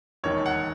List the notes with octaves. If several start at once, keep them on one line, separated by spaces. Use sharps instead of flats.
E1 D#2 D#3 C#5
F#5